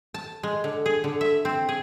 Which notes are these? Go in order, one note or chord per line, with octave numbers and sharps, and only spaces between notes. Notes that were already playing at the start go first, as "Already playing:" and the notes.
A5
G#3
D3
G#4
D3
E5
C4
G#4